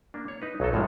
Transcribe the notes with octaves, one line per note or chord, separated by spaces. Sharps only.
A#3 D4
C#5
D#4 B4
B1 F#3 D#4 A4
A#1 A2 F3 G#3